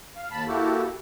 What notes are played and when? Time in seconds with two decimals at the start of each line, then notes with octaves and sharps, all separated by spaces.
0.16 F5
0.31 D#2 A5 B5
0.48 A#3 E4 F#4 G4 A4